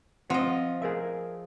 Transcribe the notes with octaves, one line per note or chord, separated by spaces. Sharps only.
F3 C4 D#5 F#5
G#4 A#4 E5